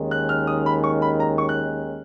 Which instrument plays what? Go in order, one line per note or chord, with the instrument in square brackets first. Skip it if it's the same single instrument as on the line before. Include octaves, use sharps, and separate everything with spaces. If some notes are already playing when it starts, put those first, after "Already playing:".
Already playing: [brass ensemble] D#2 D#3 G#3 C#4
[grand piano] F#6
F6
D#6
B5
C#6
B5
A#5
C#6
F#6